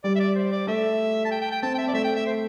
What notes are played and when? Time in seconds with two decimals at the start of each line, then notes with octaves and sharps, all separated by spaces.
0.04 G3 D5
0.15 E5
0.20 D5
0.35 C5
0.52 D5
0.67 A3 E5
1.25 A5
1.31 G5
1.41 G5
1.51 G5
1.62 C4 A5
1.75 G5
1.78 E5
1.88 D5
1.93 A3 E5
2.04 G5
2.15 E5
2.26 C5